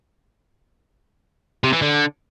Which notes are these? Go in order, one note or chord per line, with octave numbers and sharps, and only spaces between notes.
C3
E3
D3